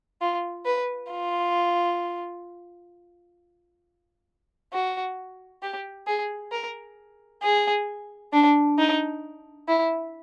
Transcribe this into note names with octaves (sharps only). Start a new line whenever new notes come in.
F4
B4
F4
F#4
G4
G#4
A#4
G#4
D4
D#4
E4